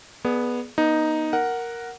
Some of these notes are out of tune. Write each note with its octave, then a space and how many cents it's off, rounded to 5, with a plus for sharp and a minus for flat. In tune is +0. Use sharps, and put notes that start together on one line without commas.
B3 -10 G#4 +15 D5 +5
B3 -35 D#4 +0
A#4 +0 F#5 +0